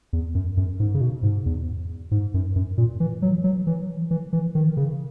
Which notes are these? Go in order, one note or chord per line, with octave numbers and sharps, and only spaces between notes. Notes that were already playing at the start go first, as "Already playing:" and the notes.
E2
F#2
F#2
G#2
C#3
B2
G#2
E2
G#2
F#2
F#2
A#2
E3
F#3
F#3
E3
E3
E3
D#3
C#3